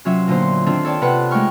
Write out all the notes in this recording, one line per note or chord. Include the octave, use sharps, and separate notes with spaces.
C3 F#3 C#4 F4 E5
A#2 D3 B3 C5
D#3 C4 D4 F4 A4
A4 C#5 D5 G5 A5
C3 B4 F#5
G#3 A3 D#4 G5 C#6 F6